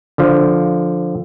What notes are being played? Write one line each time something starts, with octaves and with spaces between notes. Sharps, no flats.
D3 F3